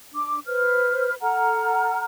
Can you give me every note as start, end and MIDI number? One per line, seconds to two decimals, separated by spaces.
0.14 0.39 62
0.14 0.39 86
0.46 1.13 71
0.46 1.13 72
0.46 1.13 89
1.21 2.05 69
1.21 2.05 78
1.21 2.05 82
1.21 2.05 89